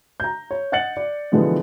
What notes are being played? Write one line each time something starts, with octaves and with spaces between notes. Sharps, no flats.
A#5 G6
C#5
D#5 F#5 F#6 A6 C#7 F#7
D5
B2 D3 E3 F3 G#3 B3